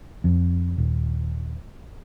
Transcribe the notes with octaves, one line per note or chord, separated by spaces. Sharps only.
F2
D#1